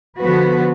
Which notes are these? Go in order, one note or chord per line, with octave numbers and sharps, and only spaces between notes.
D3 F3 B3 F#4 B4